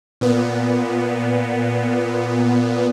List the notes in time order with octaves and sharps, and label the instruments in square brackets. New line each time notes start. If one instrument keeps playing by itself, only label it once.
[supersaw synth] A#2 B3